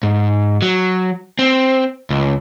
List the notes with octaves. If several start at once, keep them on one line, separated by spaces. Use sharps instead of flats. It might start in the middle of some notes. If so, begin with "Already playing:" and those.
G#2
F#3
C4
C#2